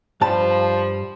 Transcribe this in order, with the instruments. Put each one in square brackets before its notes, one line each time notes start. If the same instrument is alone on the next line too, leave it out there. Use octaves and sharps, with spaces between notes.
[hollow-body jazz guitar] G2 G3 A5 [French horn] F3